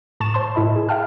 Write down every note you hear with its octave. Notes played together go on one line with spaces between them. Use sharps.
A2 A5 C#6 E7
C5 A5 C6
A2 E4 D#5 B5
G#4
E5 F5 G5 A5 F6